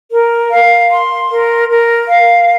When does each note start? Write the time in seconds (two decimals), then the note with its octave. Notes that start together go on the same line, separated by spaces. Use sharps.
0.12 A#4
0.52 F5
0.91 C6
1.30 A#4
1.69 A#4
2.08 F5